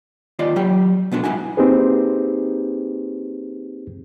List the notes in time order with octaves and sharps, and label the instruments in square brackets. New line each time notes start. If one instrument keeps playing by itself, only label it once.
[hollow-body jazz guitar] D#2 F4 D5 D#5
F#3 G4 G5
B2 B3 D4 F#4
G#2 B3 E4 F#4 F#5 G#5
[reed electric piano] A#3 C4 D#4 G4 G#4 B4